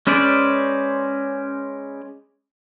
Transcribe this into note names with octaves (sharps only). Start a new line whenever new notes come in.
G#3 C#4 B4 C5 D5